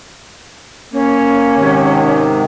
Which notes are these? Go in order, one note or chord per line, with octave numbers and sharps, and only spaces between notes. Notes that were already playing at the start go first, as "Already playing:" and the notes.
A#3 C#4
G#2 C3 D#3